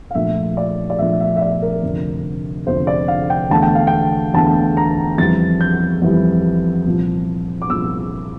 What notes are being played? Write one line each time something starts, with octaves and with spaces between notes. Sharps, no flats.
F5
A#1 A#2 A3 E5
D5
D5
A#1 A#2 A3 E5
E5
E5
D5
A#4
F1 F2 D3
F1 F2 D3 C5
D5
F5
G5
E2 D3 A3 A5
G5
F5
G5
E2 D3 A3 A5
A#5
F2 E3 G3 A6
G6
F2 E3 G3
C2 A#2 F3
D6
C2 A#2 F3 E6